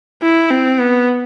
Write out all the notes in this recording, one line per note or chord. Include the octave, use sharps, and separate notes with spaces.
E4
C4
B3